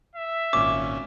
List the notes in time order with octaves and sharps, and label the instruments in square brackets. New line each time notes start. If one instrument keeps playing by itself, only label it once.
[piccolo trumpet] E5
[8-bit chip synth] G#1 A#2 C#4 [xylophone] D6